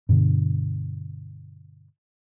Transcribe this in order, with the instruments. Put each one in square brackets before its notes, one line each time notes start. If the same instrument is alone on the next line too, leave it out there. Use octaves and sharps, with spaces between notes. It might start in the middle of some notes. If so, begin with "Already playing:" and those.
[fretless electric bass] G2 B2 D3